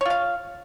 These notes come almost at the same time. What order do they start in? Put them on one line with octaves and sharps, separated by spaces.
C#5 F4 F5